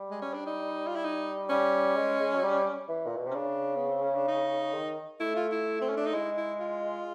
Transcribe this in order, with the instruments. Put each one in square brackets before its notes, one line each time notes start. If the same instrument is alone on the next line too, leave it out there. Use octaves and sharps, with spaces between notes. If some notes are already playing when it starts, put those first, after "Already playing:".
Already playing: [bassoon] G3
[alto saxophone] G#3
C#4
D4
D#4
F4
E4
D#4
[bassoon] G3 [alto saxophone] C#4
[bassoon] G#3
G#3
F#3
G3
E3
A#2
B2
[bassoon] C3 [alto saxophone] C#4
[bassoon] C#3 [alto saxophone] D4
[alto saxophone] B3
C4
C#4
D4
D#4
[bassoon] D#3
[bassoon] A3 [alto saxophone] E4
[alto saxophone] F4
E4
C4
C#4
D4
D#4
[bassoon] G#3 [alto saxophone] E4
[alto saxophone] E4
F4